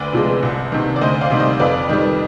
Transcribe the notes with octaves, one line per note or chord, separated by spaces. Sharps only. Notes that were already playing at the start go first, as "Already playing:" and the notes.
Already playing: D2 B4 D5
C3 F3 G#3
C2
C3 D#3
D5
D2 C5 D#5
D5 F5
C3 D#3 G3
C5 D#5
F2 B4 D5
D#3 G3